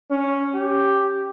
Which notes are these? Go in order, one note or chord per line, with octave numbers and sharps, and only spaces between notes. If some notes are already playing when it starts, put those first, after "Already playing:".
C#4
G4